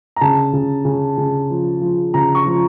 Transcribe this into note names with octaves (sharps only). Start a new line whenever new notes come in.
A#5
C#3 A5
C#3
C#3
C#3
F3
F3
C#3 A#5
C#6
F3